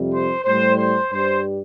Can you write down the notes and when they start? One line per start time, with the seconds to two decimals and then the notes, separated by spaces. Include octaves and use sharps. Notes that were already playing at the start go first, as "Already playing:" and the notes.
Already playing: F2 C3 G3
0.13 C5
0.45 A2 G3 C5
0.77 C5
1.09 G2 G3 C5